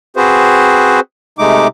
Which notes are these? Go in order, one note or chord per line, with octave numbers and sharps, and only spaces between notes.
C4 F#4 G#4 B4 C5
C3 G#3 A3 D#4 D6